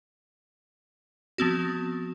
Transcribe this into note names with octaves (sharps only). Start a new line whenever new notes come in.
F3 B3 C4 F#4